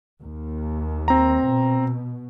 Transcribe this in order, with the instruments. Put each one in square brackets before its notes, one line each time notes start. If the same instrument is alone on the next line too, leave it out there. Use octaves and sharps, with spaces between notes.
[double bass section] D#2
[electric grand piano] C4 A#5
[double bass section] B2